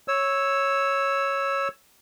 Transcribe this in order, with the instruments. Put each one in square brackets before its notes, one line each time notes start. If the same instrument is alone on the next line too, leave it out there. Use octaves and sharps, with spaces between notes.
[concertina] C#5 E6